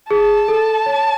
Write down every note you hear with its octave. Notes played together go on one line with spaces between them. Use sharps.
G#4 A5
A4
C#5